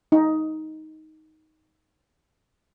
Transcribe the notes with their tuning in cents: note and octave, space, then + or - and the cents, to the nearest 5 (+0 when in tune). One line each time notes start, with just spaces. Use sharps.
D#4 +10